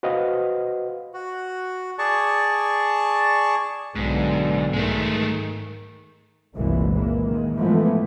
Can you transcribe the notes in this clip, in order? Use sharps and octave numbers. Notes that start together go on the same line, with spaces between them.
F#4 B4 C5 D#5 F5 F#5
F#4
G#4 D5 A5 C#6
B1 G#2 D3
G#2 D#3 G#3 A3
F#1 C2 F#2 A#2 E3 G#3
A#2 E3 G#3 A#3
D#3 G#3
G#2 E3 F3 G#3 A3 B3